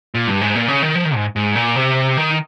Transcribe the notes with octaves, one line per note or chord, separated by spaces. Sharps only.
A#2
G2
G#2
A#2
C#3
D#3
F3
D#3
G#2
G#2
A#2
C3
D#3